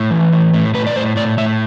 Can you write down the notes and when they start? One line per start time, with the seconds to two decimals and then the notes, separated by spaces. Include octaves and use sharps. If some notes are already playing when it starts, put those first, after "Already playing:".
Already playing: A2
0.11 E3
0.33 A2
0.54 A2
0.74 A2 B4
0.87 D5
0.96 A2 C5
1.16 A2 D5
1.38 A2 E5